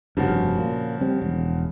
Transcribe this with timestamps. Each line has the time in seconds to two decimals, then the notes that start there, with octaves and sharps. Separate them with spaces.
0.17 F1 G2 C#3 F3 F#4
0.58 A#2
1.01 G3 C4
1.22 E1